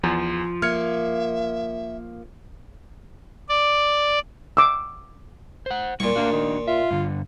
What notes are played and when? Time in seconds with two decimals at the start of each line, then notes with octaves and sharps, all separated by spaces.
0.03 E2 F3
0.62 A#3 E5 F6 G#6 C#7
3.49 D5
4.57 D6 E6
5.66 C5 F#5
6.00 A#2 G3 E4 C#6
6.16 A#3 D4 F#4
6.32 D#3
6.68 F4 E5
6.91 G2 D3